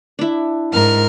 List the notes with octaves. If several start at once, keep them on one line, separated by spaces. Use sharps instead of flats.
D4 E4
G#2 A#4 F6